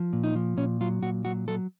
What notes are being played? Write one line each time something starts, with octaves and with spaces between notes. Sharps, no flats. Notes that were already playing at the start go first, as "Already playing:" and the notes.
Already playing: F3
A#2
D#4
F3
A#2 C#4
F#3 F4
A#2 F#4
F#3 F#4
F#3 A4